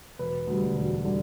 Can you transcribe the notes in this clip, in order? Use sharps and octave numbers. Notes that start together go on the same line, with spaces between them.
E1 B4
D2 D3 G3
E1
D3 G3